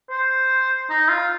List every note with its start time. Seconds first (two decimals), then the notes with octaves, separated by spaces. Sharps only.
0.10 C5
0.90 D#4
1.09 F4